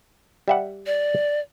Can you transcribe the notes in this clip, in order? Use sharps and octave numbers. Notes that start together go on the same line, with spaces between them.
G3 E5 F#5
D5